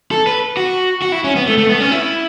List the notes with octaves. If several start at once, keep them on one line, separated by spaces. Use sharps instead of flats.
A4
B4
F#4
F#4
E4
C#4
B3
A3
A3
B3
C#4
E4